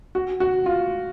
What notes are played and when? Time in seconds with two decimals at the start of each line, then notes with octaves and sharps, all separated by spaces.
0.15 F#4
0.40 F#4
0.66 F4